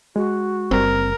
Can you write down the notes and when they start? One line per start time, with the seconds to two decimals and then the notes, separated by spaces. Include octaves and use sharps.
0.16 G#3 F#4
0.71 F#1 G3 C4 A#4